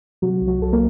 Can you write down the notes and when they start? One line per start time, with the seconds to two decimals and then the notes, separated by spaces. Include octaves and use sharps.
0.22 C3 F#3 F#4
0.41 C2
0.47 F#3 F#4
0.60 C2 A4
0.73 A#3 A#4